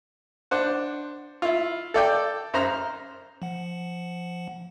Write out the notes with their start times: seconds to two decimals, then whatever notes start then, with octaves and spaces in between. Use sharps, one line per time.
0.51 D4 C5 F#5
1.42 E4 F4
1.94 A4 D5 G5
2.54 F#2 C5 A#5 F6
3.42 F3 F#5